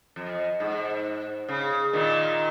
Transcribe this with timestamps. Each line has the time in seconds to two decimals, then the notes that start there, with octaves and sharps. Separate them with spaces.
0.16 F2
0.60 G#2
1.49 C#3
1.93 A#2 D#3